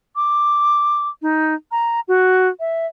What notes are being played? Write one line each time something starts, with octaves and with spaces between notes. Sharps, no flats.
D6
D#4
A#5
F#4
E5